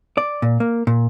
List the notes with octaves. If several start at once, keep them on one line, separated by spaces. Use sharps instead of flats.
D5
A#2
A#3
A#2